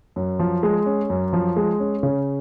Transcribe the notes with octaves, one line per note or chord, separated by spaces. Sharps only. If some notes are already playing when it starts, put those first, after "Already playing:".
F#2
F3
G#3
C#4
F#2
F3
G#3
C#4
C#3